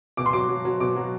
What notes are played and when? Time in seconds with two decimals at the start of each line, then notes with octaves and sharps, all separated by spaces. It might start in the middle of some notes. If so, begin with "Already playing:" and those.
0.17 B2 D6
0.26 C6
0.33 F#3 D6
0.49 F#3
0.65 F#3
0.80 B2 D6
0.96 F#3